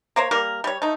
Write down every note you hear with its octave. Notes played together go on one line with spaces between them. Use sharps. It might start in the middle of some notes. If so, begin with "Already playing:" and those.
A#3 A#4 C5 C#5
G3 A#3 A#4
G3 C#5
A3 D#4